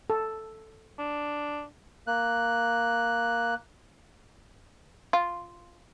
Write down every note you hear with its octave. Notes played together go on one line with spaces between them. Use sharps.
A4
D4
A#3 F#6
F4